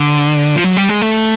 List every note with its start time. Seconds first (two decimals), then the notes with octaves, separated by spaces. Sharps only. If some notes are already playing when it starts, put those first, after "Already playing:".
Already playing: D3
0.56 F3
0.64 F#3
0.77 G3
0.89 G#3
1.02 A3